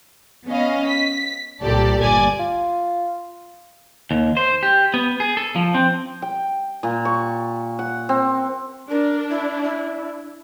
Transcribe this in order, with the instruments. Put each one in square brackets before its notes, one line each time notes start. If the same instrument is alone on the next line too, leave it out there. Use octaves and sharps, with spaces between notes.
[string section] B3 C#4 D#5 F5
B6
C2 A#2 G4 A4 D5 A5
G1 A#2 D5 G#5 G#6
[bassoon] F4
[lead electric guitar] D#2
C5
G4
B3
G#4
A4
F3
C4
[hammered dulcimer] G5
A#2
C#6
F#5
C4
[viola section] D4 [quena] A#4
[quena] E4
E4